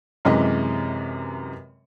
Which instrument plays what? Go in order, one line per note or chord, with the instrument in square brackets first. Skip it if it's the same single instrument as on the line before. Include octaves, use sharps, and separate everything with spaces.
[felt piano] F#2 C3 E3 G#3 D#5